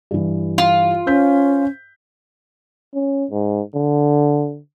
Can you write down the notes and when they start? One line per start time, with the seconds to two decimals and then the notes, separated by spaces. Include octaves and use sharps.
0.11 G2 E3
0.58 F4
1.07 C#4 C5 G6 B6
2.94 C#4
3.31 G#2
3.75 D3